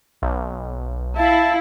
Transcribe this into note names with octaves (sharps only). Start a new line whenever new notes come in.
B1
E4 F5 A5